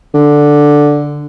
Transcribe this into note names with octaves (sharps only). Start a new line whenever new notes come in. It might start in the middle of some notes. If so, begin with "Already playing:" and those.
D3